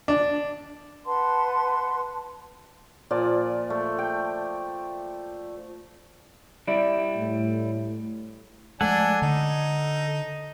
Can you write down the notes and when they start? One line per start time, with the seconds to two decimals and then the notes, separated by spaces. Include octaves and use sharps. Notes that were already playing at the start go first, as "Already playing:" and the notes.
0.08 D4
1.06 B4 F#5 A5 C6
3.11 A#2 F3 D5
3.70 A3
3.99 G5
6.68 G3 E4 D5
7.17 A2
8.81 F3 G#3 A3 D4 A4 F#5 G#5
9.22 D3 D#4